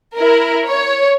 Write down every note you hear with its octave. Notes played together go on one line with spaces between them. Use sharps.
E4 A#4
C#5